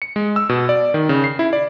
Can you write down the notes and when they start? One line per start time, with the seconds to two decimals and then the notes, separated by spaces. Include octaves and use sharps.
0.02 C#7
0.16 G#3
0.36 E6
0.49 B2
0.69 D5
0.94 D#3
1.09 C#3
1.24 C7
1.39 E4
1.53 D5